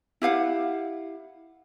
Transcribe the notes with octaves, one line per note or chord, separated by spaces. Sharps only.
E4 G4 F5 F#5